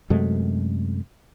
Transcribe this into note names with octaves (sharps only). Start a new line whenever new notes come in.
F#2 C3 G#3 A3